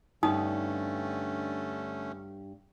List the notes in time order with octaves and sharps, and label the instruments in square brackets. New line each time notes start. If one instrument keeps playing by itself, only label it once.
[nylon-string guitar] G2 G3 B3 [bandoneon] D3 A3 C#4 [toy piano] D#4 D#6